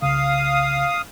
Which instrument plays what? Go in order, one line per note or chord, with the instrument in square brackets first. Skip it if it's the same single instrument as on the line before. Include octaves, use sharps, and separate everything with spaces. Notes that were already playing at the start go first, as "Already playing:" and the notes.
[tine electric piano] C2 C#3 [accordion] F5 D#6